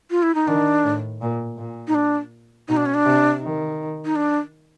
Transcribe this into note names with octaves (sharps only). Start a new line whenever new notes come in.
F4
E4
D#4
D#3 D4
A2
A#2
A#2
D#4
D4
B2 D#4
D4
C#4
D4
C3
D#3
D#4
D4